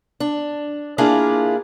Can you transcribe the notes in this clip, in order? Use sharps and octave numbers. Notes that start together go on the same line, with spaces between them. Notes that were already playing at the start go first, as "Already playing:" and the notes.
D4
A#3 D4 E4 F4 G#4 A#4